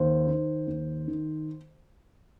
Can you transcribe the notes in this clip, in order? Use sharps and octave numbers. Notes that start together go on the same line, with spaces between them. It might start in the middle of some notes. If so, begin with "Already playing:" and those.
Already playing: D#2 C5
D#3
D#2
D#3